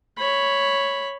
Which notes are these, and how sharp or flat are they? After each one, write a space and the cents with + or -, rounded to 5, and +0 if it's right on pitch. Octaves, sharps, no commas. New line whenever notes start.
C#5 +0 B5 +0